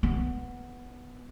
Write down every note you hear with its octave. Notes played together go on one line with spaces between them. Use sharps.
B3